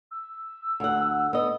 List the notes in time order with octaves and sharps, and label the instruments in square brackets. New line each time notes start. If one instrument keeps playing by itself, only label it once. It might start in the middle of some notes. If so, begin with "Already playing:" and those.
[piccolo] E6
[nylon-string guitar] D2 F#5
B3 D#5